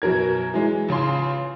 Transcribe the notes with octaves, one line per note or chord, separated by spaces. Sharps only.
F#2 B2 A#4 G#6
E3 F#3 G#3
A1 C#3 F4 C6